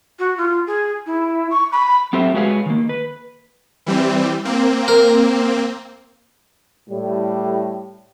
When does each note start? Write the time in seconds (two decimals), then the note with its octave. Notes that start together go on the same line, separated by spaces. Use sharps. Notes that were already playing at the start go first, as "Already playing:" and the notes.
0.19 F#4
0.37 F4
0.67 G#4
1.07 E4
1.51 C#6
1.72 B5
2.13 F#3 C4 G4 A4 C5 E5
2.34 G#3 F#4 G#4 B4 C#5 F5
2.66 D#3 A#3
2.89 B4
3.86 E3 G3 C4
4.45 A#3 C4
4.88 A#4
6.89 A2 G3